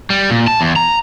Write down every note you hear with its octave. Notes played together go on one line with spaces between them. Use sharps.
G3
A#2
A5
E2
A#5